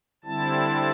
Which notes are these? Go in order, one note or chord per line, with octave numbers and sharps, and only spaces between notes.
D3 G3 C4 E4 A5